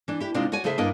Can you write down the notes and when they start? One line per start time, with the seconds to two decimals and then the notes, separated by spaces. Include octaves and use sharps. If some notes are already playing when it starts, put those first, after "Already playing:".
0.08 E3 D4
0.20 E4 G4
0.34 C3 G#3 C4 D4 D#4 F4
0.52 F#4 C#5 D5 G#5
0.64 C#3 A3 G#4 A4 C5 E5
0.78 G2 A#3 D4 E4 D#5